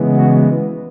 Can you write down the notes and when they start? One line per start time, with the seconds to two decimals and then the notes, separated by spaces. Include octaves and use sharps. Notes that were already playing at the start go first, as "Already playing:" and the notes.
Already playing: C#3 E3 G#3 B3
0.16 F#4